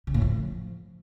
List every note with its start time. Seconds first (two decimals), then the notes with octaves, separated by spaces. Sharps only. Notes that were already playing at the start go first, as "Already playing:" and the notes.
0.07 C#3
0.14 A2
0.21 F3